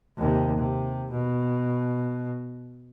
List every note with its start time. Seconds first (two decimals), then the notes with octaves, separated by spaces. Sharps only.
0.18 D#2 C3
0.58 C3
1.11 B2